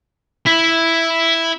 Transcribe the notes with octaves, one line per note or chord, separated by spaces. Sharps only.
E4